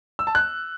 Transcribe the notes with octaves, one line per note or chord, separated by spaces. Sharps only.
E6
A5
F#6